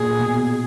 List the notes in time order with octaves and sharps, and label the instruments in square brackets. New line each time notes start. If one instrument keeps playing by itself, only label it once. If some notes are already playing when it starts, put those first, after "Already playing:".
Already playing: [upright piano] A#2 [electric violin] G#4
[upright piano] B2